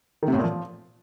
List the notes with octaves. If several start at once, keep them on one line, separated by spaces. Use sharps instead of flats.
D#3
C3
A2
A#2
F3